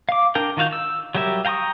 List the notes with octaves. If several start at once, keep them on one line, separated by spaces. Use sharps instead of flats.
F5 D6
D4 A#4 G5
D#3 F4 F#4 F5 G6
E6
F#3 G3 G4 A#4 E5
F5 G5 A#5 C#6 D#6